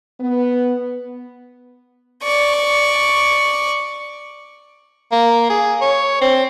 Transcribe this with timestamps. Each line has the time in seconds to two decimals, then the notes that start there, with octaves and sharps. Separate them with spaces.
0.20 B3
2.23 D5 C#6
5.12 A#3
5.50 G#4
5.81 C#5
6.21 C4